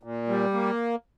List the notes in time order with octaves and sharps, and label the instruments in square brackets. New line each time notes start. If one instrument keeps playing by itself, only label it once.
[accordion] A#2
G3
A#3